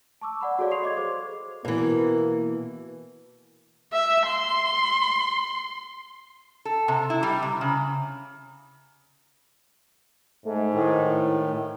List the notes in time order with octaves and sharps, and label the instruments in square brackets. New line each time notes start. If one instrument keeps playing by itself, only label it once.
[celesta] A5 C#6 D6 E6
D5 F#5 B5
F#4 G#4 A4 C#5 D5 F5
F5 C6 C#6 D#6 C7 F7
D#5 D6 G#6
G#4 A4 C5 D6
[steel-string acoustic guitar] B2 E3 [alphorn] A#3
[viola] E5
C6
[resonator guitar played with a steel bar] A4
C3
E4
G3
C3
C#3
[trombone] G#2 [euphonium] A3
[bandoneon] A2 D#3 [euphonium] E4